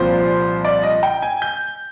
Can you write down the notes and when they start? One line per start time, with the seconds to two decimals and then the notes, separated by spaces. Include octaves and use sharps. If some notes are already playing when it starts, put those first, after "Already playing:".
Already playing: C2 A#2 F3 C4 C5
0.65 D5
0.83 D#5
1.03 G5
1.22 G#5
1.42 G6